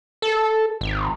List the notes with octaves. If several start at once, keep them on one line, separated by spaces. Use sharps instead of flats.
A4
G#1